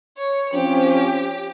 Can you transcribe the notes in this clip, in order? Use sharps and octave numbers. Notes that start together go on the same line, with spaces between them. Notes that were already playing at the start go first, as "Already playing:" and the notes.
C#5
F3 C4 C#4 G4